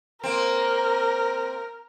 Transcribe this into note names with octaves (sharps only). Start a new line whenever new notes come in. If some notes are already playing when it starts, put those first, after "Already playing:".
A#3 C4 A#4